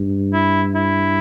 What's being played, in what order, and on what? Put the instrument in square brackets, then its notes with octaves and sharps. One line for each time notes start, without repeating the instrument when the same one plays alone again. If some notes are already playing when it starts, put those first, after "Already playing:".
Already playing: [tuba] G2
[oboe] E4
E4